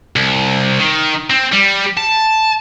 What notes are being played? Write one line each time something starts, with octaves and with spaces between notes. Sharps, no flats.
C2
D#3
C4
G3
A5